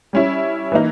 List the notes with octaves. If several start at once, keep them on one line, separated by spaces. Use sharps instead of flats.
G3 C#4 E4
E3 A#3 D#4